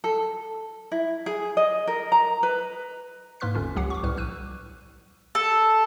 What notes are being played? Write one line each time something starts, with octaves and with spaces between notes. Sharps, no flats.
A4
E4
G#4
D#5
A#4
A#5
B4
G#2 A#3 B4 C6 F6 B6
G1 D#2 D3 C#4 F4
C#2 F#3 G4 F#5 C7
C#6 D6
C2 A2 B4 F6
A#1 E6 F#6 D#7
A4